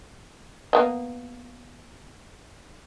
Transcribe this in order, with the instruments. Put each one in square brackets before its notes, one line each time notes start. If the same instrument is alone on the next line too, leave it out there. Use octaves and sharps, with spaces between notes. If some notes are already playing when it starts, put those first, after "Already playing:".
[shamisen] A#3 B3 D#5